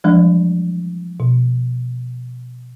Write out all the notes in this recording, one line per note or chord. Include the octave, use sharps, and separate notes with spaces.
E3 F3 G3 G#3 D4
B2